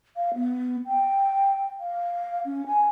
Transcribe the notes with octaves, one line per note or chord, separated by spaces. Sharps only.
F5
B3
G5
F5
C#4
G#5